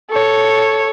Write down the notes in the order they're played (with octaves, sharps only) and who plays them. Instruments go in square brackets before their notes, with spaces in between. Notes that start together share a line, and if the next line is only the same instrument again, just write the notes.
[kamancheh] A4 C#5